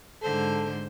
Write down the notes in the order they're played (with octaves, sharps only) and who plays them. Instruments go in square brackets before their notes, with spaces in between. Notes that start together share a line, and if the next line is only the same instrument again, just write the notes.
[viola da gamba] G#2 D3 C5 [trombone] A4